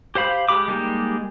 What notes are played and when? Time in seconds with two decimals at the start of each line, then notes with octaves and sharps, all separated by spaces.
0.15 G4 C5 F5 B5
0.49 G#3 G4 B5 D6
0.68 G3 G#3 A#3 D#4 G4